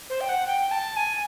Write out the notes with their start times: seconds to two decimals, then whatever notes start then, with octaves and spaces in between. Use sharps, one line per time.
0.10 C5
0.21 G5
0.29 F#5
0.47 G5
0.71 A5
0.97 G#5